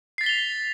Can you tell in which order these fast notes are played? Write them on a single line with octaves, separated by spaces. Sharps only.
C7 A6 B6 G7 F7